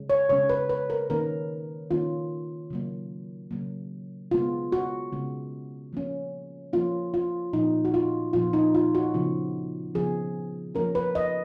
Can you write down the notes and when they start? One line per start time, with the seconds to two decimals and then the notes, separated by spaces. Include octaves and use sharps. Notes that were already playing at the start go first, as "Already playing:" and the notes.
Already playing: C#3 G#3 C#4
0.10 C#5
0.29 C#3 G#3 C#4 C#5
0.50 B4
0.69 B4
0.90 A#4
1.10 D#3 A#3 C#4 A#4
1.91 D#3 A#3 C#4 F4
2.70 C#3 F#3 A#3
3.51 C#3 F#3 A#3
4.31 C#3 G#3 B3 F4
4.72 F#4
5.12 C#3 G#3 B3
5.93 F3 A#3 C#4
6.73 F3 A#3 C#4 F4
7.14 F4
7.53 A#2 F3 B3 D#4
7.85 F#4
7.94 F4
8.33 A#2 F3 B3 F4
8.53 D#4
8.75 F4
8.95 F#4
9.14 C#3 F3 B3
9.95 C#3 F3 B3 G#4
10.75 F3 A#3 C#4 A#4
10.95 B4
11.15 D#5